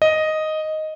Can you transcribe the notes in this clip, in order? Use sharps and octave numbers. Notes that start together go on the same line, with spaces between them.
D#5